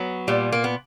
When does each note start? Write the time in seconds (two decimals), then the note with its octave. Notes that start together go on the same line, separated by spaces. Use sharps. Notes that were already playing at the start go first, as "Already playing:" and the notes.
Already playing: F#3 B3
0.28 A#2 G3
0.52 A#3
0.64 B3